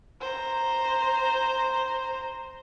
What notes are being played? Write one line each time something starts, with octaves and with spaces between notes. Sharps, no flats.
C5 A#5